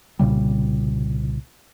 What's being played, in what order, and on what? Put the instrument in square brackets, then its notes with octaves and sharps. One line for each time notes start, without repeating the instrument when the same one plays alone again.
[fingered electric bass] C2 A#2 C#3 G3